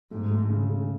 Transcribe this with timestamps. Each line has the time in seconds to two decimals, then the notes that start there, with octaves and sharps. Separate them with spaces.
0.11 G#2 A3
0.31 A3
0.49 C#3
0.69 C#3